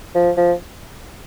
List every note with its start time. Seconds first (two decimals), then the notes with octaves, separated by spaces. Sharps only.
0.15 F3
0.37 F3